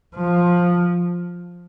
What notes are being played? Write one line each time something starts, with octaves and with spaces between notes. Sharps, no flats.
F3